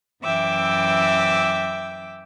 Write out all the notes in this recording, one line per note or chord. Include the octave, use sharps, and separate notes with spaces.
F#2 E3 E5 G5 D6 E6